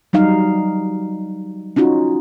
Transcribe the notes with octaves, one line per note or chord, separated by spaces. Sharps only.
F#3 G3 D#4 F5
C#4 D#4 F4 F#4